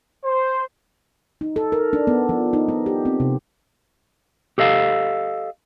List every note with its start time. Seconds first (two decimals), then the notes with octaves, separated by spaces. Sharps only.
0.24 C5
1.41 D#4
1.56 A4
1.72 A#4
1.93 D4
2.07 B3
2.29 F3
2.53 D#4
2.69 B3
2.86 G4
3.05 C4
3.20 C3
4.58 G4 A4 D#5 F5